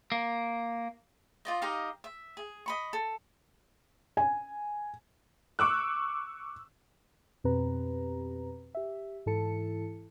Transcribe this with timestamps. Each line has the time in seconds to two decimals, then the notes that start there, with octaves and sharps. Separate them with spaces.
0.12 A#3
1.45 F4 D5 D#5
1.62 D#4 G4 D#5 F5
2.04 E5
2.37 G#4
2.66 D#5 B5 C#6
2.93 A4
4.17 G#5
5.59 C#6 D6 E6 F#6
7.44 F2 B2 C4 G4 B4 A#5
8.75 G4 E5
9.26 G#2 E3 E4 A4 A5 C#7